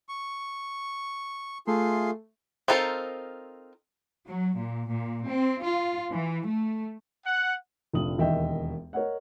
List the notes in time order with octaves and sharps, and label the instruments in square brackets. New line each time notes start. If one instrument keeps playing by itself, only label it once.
[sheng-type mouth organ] C#6
[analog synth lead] A3 [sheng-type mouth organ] F4 G#4 C6
[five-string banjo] C4 D#4 F4 A4 A#4
[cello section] F#3
A#2
A#2
C4
F4
E3
A3
[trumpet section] F#5
[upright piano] F1 A#1 D#6 F#7
E1 D#2 D#5 E5 G5
A#4 C#5 D#5 F#5